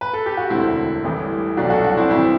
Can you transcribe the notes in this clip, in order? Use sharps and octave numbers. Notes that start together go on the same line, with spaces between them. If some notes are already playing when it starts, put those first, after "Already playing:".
B4
A4
G4
F#4
E1 D2 D3 C4 E4
A1 A2 E3 G3
C2 B2 F#3 A3 D4 F#4
F#4 A4
D4 F#4
C4 E4
C2 C3 E3 C4 E4